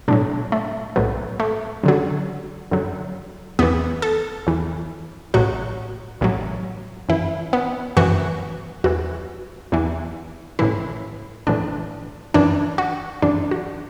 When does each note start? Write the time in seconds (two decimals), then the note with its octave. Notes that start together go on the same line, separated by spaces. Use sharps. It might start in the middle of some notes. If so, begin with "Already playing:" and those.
0.08 B1 A2 F#3 D4
0.52 A3
0.96 B1 A2 F#3 B3
1.40 A3
1.83 F#2 D3 F#3
2.71 F#2 D3 F#3
3.59 E2 E3 B3
4.02 A4
4.47 E2 E3
5.34 A1 A2 F#3 F#4
6.21 A1 A2 F#3
7.09 F#2 E3 E4
7.53 B3
7.97 F#2 E3 F#4
8.84 E2 E3 F#4
9.72 E2 E3
10.59 A1 A2 E3 E4
11.47 A1 A2 E3 D4
12.34 F#2 E3 D4
12.78 F#4
13.22 F#2 E3 D4
13.51 F#4